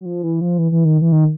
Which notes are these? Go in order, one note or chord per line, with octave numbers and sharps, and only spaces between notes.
F#3
F3
E3
F3
E3
E3
D#3
E3
D#3